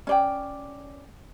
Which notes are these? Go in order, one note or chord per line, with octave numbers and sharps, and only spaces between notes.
C#4 D5 G5